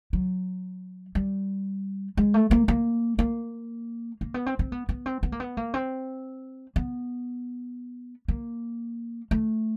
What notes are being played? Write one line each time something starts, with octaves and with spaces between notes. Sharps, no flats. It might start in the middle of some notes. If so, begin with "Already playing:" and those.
F#3
G3
G#3
A3
A#3
A#3
A#3
A#3
B3
C4
C4
B3
B3
C4
B3
A#3
B3
A#3
C4
B3
A#3
A3